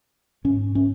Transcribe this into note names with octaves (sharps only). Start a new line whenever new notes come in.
G#2 C#4
C#4